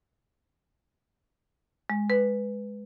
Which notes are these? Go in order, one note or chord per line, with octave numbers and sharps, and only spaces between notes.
G#3
B4